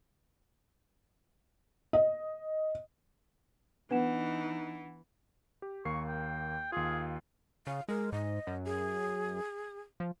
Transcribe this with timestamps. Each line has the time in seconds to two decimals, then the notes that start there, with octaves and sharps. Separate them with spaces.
1.93 D#5
3.91 E3 B3 D4 D#4 B4 F#5 E7
5.62 G4
5.85 D#2 A#3 C#6 C7
6.08 G5
6.72 D#2 F4 G#4
7.67 C#3 F5
7.89 G#3 A#4
8.12 G#2 D#5
8.47 F#2
8.65 G#4
10.00 F3